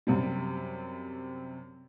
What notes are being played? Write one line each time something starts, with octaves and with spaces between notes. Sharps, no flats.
F#2 C3 G3